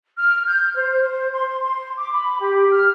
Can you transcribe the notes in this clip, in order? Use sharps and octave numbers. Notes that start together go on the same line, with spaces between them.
F6
G6
C5
C5
C6
C6
D6
B5
G4
F6